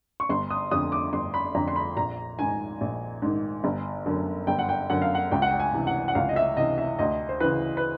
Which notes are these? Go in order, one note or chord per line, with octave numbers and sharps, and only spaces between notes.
C#6
G1 C6
D#6
F2 D3 D#6
D6
G1 C6
B5
F2 D3 A#5
C6
B5
A#1 A#5
G#2 D#3 G#5
A#1
G#2 D#3
G1
F#2 D3
G1 G5
F#5
G5
F#2 D3 F#5
F5
F#5
C#2 G5
F#5
G5
G#5
C3 E3
F#5
F#5
C#2 F5
D#5
E5
C3 E3 D#5
E5
D2 D#5
C5
C#3 E3 B4
B4